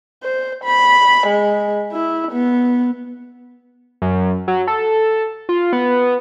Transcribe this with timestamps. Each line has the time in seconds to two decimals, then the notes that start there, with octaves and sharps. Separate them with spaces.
0.23 C5
0.64 B5
1.27 G#3
1.92 E4
2.32 B3
4.02 F#2
4.48 F#3
4.68 A4
5.49 F4
5.73 B3